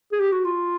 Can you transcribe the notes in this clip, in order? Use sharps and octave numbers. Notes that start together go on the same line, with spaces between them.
G#4
G4
F#4
F4